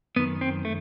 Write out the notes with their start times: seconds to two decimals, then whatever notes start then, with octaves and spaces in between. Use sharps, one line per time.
0.16 F#2 D#3 B3
0.41 C4
0.65 A3